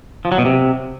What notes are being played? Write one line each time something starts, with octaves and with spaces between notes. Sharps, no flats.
F3
F#3
B2
C3